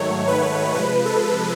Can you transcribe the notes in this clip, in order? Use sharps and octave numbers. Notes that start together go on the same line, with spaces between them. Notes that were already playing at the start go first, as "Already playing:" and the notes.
Already playing: G#2 D#3 F#3 A3 C#5
B4
C3 F3 G#3 B4
A4